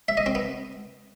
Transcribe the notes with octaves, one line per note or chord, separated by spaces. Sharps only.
E5
D#5
C4
B3